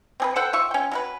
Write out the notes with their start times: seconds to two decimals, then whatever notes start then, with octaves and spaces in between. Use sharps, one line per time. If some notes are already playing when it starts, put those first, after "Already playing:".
0.20 C4 G#4 B4
0.36 A4 C5 F#5 G5
0.53 F4 E5 C#6
0.71 C#4 G5
0.92 F#3 A#4 B4